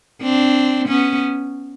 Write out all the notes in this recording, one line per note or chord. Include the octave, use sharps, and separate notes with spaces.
C4 D4
B3 C#4